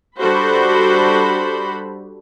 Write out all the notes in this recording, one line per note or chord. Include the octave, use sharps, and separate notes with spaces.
G3 D4 F#4 A4 C5 B5